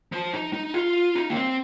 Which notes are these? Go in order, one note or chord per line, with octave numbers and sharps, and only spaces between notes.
F3
D#4
D#4
F4
D#4
A#3
C4